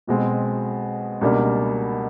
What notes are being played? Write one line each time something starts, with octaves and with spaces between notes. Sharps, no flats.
B1 B2 G#3 C4
C#2 B2 G3 A#3 D4